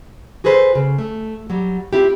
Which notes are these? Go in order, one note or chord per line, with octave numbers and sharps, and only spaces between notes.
F#4 G#4 A4 B4 C5
C#3
A3
F#3 G3
C4 E4 F4 G4